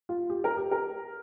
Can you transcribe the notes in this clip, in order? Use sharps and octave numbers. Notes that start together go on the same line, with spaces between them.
F4
G4
A#4
G4
A#4